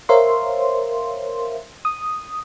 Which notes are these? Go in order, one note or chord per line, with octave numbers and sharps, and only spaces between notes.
A#4 C5 C#5 E5 F5 C6
D#6